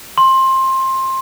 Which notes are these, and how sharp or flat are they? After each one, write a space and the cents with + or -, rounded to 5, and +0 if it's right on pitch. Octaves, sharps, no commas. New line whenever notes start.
C6 +20